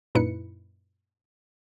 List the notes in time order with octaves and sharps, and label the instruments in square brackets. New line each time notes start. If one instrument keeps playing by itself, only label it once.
[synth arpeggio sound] F#2 A#2 D#4 E4 B4 C#7